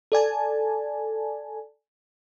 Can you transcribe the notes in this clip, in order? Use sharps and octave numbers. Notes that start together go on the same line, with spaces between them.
A4 D5 G#5 A5